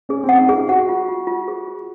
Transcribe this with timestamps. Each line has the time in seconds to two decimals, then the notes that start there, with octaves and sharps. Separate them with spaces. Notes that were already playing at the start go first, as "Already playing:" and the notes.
0.09 C#4 G#4
0.24 C4
0.29 F#5
0.38 D#4
0.49 F4 G#4
0.69 F#4 F#5
0.89 F4
1.08 F4
1.27 F4
1.48 G#4
1.67 F4